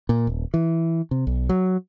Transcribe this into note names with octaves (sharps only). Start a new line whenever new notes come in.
A#2
D#1
E3
C3
B1
F#3